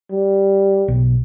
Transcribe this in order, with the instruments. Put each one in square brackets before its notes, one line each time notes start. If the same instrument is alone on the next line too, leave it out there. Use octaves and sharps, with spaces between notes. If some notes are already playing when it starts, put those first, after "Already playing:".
[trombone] G3
[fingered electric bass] B1